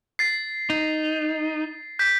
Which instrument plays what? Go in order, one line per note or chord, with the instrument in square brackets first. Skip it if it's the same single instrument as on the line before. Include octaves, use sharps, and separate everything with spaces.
[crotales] A6 C7
[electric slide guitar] D#4
[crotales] G6 B6